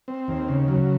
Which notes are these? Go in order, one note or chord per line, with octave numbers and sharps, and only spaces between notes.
C4
D#2
C#3
F#3